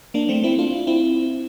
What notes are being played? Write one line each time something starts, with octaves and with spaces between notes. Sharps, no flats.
A#3 D4
A3 C4
C4 E4
D4 F4
C4 E4